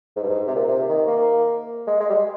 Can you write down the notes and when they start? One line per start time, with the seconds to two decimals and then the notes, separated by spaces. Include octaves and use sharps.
0.16 G#2
0.23 G2
0.29 G#2
0.47 C3
0.55 A#2
0.68 C3
0.88 D#3
1.07 A#3
1.87 G#3
2.00 G#3
2.09 G3
2.14 G#3